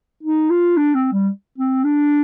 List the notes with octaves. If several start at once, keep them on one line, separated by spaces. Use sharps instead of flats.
D#4
F4
D4
C4
G3
C4
D4